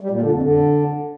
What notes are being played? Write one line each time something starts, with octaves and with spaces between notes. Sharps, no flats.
G3
A#2
D3
F2
D3